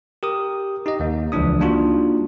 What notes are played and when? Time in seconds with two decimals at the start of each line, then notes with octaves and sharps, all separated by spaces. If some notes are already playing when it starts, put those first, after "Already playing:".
0.23 G4 A#4 D#6
0.86 D#4 G4 D#5
1.00 D#2 A#3
1.32 C#2 E3 F3 D4 D#6
1.60 G3 A#3 D4 D#4 F4 F#4